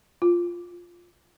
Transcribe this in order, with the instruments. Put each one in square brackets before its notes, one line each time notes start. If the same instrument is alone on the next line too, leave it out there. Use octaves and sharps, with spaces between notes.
[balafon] F4